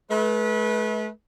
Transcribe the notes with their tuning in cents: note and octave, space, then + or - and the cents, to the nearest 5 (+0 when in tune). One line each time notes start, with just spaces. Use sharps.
A3 -40 B4 -25